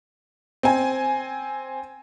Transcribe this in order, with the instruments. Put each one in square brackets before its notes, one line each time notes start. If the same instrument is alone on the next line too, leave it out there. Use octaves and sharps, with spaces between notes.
[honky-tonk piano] C4 G#5